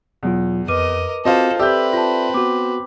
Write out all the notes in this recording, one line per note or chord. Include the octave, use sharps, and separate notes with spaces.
E2 B2 F#3 F4
F2 A#4 B4 D#5 D6 D#7
C4 F4 F#4 A4 A#4 C5 D#5
C4 G4 A4 B4 D5 E5 E6 G6
F4 A5
B3 F#4 D6